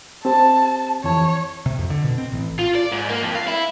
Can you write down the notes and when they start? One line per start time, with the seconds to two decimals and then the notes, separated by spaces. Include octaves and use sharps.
0.25 C4 G4 C5 A5
1.04 F2 E3 C#5 A5
1.66 C3
1.79 F2
1.90 D3
2.04 B2
2.18 C4
2.32 A1
2.59 F4
2.75 D5
2.92 G#2
3.09 A#3
3.22 F2
3.35 F5
3.48 E4